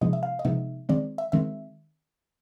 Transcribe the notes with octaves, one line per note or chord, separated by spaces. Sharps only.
C3 F3 G#3 B3 D#4 D#5
E5
F5
D#5
C3 F3 G#3 B3 D#4 E5
D#3 G#3 C4 D5
E5
D#3 G#3 C4 E5